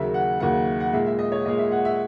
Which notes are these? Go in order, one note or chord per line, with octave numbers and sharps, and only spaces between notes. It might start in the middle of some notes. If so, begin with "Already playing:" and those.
Already playing: D#2 C#3 F#3 A#3 E5
F#5
D#2 C#3 F#3 A#3 F#5
F#5
A#2 G#3 E5
E5
D#5
C#5
A#2 G#3 D#5
E5
F#5
E5